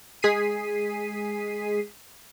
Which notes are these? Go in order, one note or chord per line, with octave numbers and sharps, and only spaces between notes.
G#3 G#4 B6 C7 D#7